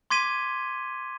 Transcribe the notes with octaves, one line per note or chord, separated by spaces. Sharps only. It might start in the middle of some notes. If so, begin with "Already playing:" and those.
C6 D6 G#6 B6 D#7 G7